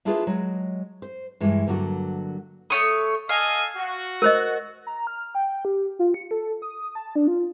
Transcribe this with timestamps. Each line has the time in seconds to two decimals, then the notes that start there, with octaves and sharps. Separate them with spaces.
0.05 A#3 D4 E4 F4 G#4 B4
0.27 F#3 G#3
1.02 C5
1.40 G2 E3 G#3
1.67 G2 D3 F#3 A#3 F#4
2.70 A3 C#5 D#6
3.29 A4 D#5 F5 G#5
3.76 F#4
4.22 A#4 C5 D#5
4.87 A#5
5.07 F6
5.35 G5
5.65 G4
5.99 F4
6.14 C#7
6.31 A4
6.62 D#6
6.95 A5
7.16 D4
7.28 F4